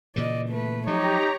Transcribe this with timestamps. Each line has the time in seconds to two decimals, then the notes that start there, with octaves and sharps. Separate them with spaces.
0.16 A#2 C#3 E3 D5 D#5
0.49 A3 B4
0.87 F3 F#3 D#4 G4 C#5 A#5